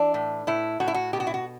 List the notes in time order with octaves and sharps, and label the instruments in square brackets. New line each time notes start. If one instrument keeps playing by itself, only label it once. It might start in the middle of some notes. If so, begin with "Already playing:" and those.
Already playing: [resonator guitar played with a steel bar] E3 D4
A2
A2 E4
A2 F#4
E4
F#4
B2 G4
F#4
E4
F#4